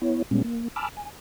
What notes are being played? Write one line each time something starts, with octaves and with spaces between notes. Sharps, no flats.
B3 E4 C#5
A#2 G3 G#3 B3 C#4
A#3
G#5 A5 B5 D6 E6 F6
G#5